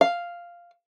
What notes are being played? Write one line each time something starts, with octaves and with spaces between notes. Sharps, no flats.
F5